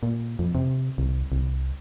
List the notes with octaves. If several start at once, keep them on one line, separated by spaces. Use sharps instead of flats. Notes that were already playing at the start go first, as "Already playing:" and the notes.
A#2
F2
C3
C2
C2